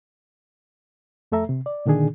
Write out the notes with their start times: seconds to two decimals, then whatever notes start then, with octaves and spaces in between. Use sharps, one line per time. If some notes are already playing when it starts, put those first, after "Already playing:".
1.32 F2 A3 A4 E5 A#5
1.49 C3
1.66 D5
1.86 A#2 D3 D#3 D4 G#4